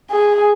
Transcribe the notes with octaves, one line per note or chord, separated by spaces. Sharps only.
G#4